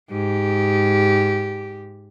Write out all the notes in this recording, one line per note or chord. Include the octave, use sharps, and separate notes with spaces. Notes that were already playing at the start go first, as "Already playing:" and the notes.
G#2 G4